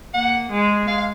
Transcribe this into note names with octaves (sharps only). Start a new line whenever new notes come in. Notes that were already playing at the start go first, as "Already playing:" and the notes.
A#3 F#5
G#3
F5
F5